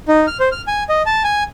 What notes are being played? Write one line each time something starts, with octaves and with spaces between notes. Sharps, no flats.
D#4
F6
C5
F6
G#5
D#5
A5
G#5